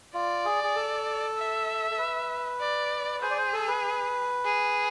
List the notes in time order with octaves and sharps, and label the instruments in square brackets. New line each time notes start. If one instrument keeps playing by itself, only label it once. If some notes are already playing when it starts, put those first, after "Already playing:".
[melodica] F4 [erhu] D5
[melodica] G#4
G#4
A4
[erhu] E5
[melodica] A4
B4
[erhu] D5
[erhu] G#4 [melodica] C5
[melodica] D5
C5
A4
B4
[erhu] G#4